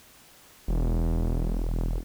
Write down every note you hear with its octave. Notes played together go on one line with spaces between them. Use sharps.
E1